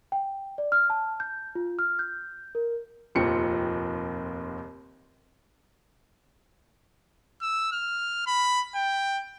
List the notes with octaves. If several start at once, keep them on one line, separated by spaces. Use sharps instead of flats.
G5
D5
F6
A5
G6
F4
F6
G6
A#4
F1 D#2 A#2 F3 C4 C#7
E6
F6
B5
G5